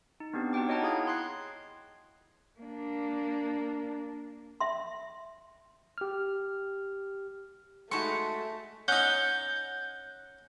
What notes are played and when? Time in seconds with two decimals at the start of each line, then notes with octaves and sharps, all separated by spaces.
0.20 D#4
0.33 B3 C4 D4 G4
0.53 D#4 F#4 F#5 G5 D6
0.69 C#5 D#5 F#5 G5 A5 A#5
0.82 E4 G#4 F5 D#6 G#6
1.07 C6 F#6 G#6 C7
2.60 A#3 D4
4.61 E5 C6
5.98 G4 F6
7.91 G#3 A3 D#4 F#4 A5 B5 C#6
8.88 C#4 D#4 F#5 G6